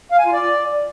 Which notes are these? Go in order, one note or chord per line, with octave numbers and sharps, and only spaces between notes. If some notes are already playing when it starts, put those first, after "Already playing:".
F5
G#5
F4
D5